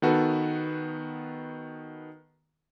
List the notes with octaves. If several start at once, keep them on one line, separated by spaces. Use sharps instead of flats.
D#3 B3 F#4 A4 B4